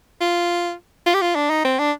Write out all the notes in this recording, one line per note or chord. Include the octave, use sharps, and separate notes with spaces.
F4
F4
G4
F4
D4
D#4
C4
D4